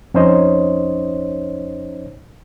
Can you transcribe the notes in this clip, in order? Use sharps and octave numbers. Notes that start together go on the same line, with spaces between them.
F2 C#4 D#4 C5 C#5 D#5